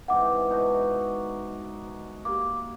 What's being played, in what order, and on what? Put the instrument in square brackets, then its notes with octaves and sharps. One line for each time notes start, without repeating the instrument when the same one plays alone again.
[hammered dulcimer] G#2 C3 E3 [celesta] F#5 D6
[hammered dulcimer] B2 D#4 F#4
[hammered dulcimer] A#3 [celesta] G4 D6